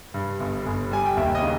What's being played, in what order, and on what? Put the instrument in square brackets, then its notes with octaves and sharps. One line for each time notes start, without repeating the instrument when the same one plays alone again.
[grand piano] G2
G1
G1
G3 G#5
G5
D#2 E5
D#5
C#3